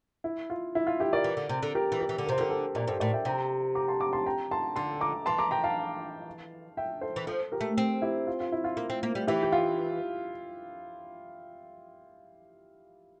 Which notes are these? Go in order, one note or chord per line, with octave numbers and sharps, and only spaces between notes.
E4
F4
E4
F4
E4 G4
A#4 D5
E3
D3
C3
D3
G4 A#4
E3
G4 A#4
E3
D3
A#4
C3 C5
D3 G4 A#4
A4 C5
A#2 A#4 D5
G2 A4 C5
A2 A#4 D5
E5 G5
C3 G5 A#5
A#5 D6
A5 C6
A#5 D6
A5 C6
G5 A#5
A5 C6
D3 A5 C6
A#5 D6
E3 A5 C6
A#5 D6
G5 A#5
F5 A5
E5 G5
A4 C5
E3
F3 A4 C5
G4 A#4
A3
C4
E4 G4
F4
F4
E4
F4
A#3
C4
A#3
G3
E3 E4 G4
G4
F4